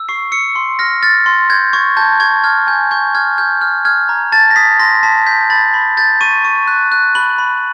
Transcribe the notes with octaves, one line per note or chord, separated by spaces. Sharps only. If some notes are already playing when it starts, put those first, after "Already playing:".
Already playing: E6
C#6 C7
E6 C#7
C6
F6 A#6
F6 A6
C6
G6 G#6
C#6 G#6
A5 G6
C#6 G#6
F6 G#6
G#5 G6
C#6 G6
F6 G#6
F6 G6
F6
F6 G#6
A#5
A5 A6
A#6
D#6 B6
C6 A#6
A5 B6
G6 B6
B5 A6
B5
G6 A6
C#6 D#7
C#6
F#6
F#6
B5 F#7
B5